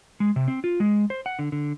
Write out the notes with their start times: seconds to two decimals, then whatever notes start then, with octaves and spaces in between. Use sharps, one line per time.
0.20 G#3
0.36 C3
0.48 C4
0.64 F4
0.80 G#3
1.10 C5
1.26 F#5
1.39 D3
1.52 D3